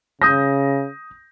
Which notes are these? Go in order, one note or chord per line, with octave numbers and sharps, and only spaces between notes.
C#3 D#6 G6 A#6